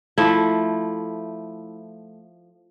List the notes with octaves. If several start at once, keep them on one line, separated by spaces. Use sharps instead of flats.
F3 A3 E4